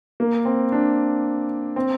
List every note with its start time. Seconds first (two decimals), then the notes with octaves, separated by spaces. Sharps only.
0.20 A#3
0.45 C4
0.72 D4
1.76 C4